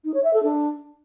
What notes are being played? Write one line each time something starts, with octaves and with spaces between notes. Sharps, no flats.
D#4
C#5
E5
A4
D4